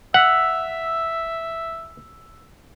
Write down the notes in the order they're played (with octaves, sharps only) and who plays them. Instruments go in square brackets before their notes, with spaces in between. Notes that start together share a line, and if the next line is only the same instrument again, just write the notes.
[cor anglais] E5 [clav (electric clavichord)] F#5 [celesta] E6 B6 F7